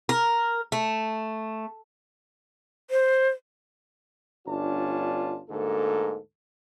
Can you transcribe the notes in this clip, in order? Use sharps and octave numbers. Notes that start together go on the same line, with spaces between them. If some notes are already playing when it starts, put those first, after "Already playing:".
A#4
A3
C5
G1 C#4 D4 F4 A5
D2 G#2 A#3 A4